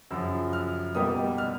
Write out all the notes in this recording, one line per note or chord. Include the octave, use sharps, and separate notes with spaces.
F#2 C#3 F3 E6
F6
B2 G3 A#3 D#4 D#6
F6